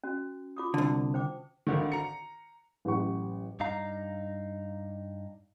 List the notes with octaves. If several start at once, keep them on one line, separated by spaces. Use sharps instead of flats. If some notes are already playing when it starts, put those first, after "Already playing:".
C#4 F#4
F4 D6 D#6
C2 D3 A5
C5 G5 D6
G#1 D3 D#3
A#5 C#7
A1 F#2 G4 F#5 C#6
G2 D#4 F5 A#5